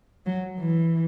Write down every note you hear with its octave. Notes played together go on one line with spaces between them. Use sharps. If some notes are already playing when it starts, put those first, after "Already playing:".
F#3
E3